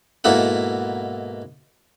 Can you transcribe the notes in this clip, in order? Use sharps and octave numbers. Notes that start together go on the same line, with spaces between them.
G#2 B2 A#3 E4 A4 F#5